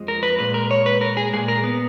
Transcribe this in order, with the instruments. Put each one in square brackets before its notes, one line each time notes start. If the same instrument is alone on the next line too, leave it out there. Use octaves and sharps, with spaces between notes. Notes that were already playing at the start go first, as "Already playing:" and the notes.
Already playing: [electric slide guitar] F2 F3 G#3
A#4
B4
A#2 G#3 B4
A#4
C#5
B4
A#4
G#4
A#2 G#3 G#4
A#4
B3